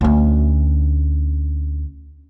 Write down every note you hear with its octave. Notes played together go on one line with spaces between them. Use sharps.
D2 C#4